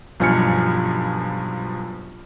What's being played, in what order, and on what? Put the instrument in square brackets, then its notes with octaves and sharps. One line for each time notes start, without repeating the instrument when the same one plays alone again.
[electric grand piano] B1 G2 F3 G#5 F6 C#7